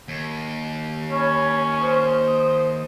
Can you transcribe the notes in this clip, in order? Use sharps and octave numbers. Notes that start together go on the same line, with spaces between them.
D#2
C#4 C#5 B5
C5 D#6